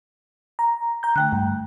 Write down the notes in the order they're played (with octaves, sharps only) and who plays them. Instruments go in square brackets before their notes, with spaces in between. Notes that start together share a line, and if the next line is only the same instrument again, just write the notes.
[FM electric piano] A#5
A#5 G6
[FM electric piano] D3 [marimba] A3 G5 F#6
[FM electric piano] G2